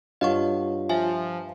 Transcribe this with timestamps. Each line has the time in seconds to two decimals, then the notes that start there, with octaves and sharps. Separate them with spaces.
0.21 G2 F4 C#5 D#5 F5 F#5 C#6
0.89 F3 E5 G#5